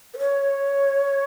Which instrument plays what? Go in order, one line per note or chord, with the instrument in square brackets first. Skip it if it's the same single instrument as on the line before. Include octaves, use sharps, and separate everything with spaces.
[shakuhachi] B4
C#5